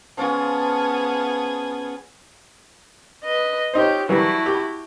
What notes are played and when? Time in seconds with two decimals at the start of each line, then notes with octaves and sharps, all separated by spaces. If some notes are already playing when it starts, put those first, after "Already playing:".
0.17 F3 B3 C#4 F4 G#4
3.23 B4 D#5
3.74 D#4 F4 G4 C5 C#5
4.09 E3 F#3 G3 A3 E4 F#4
4.46 G4